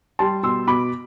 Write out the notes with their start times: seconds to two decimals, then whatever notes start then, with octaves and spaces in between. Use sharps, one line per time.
0.19 G3 A5 C6
0.43 B2 C6 E6
0.67 B2 B5 D6